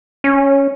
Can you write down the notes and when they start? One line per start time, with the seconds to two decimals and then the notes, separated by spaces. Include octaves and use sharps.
0.24 C#4